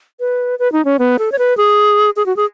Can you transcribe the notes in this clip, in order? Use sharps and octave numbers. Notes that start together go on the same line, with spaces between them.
B4
B4
D#4
C#4
B3
A4
C#5
B4
G#4
G#4
F#4
G#4